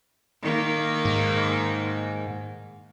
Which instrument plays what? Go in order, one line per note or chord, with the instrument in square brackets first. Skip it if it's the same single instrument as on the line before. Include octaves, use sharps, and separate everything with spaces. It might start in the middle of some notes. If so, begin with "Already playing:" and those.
[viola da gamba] D#3 A#3
[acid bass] G#2